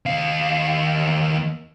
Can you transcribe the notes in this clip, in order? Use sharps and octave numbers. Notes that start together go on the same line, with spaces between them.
D#2 F5